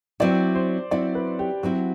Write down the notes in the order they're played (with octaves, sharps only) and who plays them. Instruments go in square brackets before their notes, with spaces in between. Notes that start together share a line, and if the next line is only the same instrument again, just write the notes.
[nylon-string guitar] F#3 C4 E4 [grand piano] D5
[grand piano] C5
[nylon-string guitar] F#3 C4 E4 [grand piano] D5
[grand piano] B4
G4
[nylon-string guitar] F#3 C4 E4 [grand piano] F#4